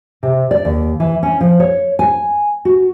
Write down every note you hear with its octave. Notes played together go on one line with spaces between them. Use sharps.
C3
D5
D#2
E3
C#4
F3
C#5
G#5
F#4